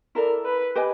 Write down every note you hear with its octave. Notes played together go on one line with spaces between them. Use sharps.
E4 A4 A#4 D5
B4
G4 B4 D#5 G#5